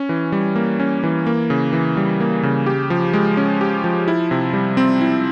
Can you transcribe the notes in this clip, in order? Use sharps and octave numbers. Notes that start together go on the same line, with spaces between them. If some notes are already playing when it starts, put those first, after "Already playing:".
Already playing: C#4
E3
G3
A#3
C#4
E3
A#3
C#3
E3
G3
A#3
C#3
G4
F3
G#3
C#4
G4
F3
E4
C3
G3
C4
E4